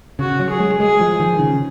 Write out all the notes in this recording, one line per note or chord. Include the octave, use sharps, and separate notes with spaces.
C#3 F#4
F#3
G#4
G#3
G#3 G#4
F3
D#3
C#3